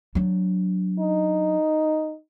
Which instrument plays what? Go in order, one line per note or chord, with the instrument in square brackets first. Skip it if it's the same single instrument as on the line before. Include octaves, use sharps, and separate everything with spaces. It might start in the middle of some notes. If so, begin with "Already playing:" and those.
[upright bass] F#3 D4
[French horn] D#4